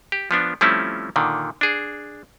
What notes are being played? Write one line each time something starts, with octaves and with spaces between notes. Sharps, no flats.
G4
F3 B3 D4
F3 G3 A3 C4 C#4 E4
A#2 D3 D#3
D4 G#4